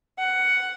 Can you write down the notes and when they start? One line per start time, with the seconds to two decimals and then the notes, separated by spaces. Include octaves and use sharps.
0.18 F#5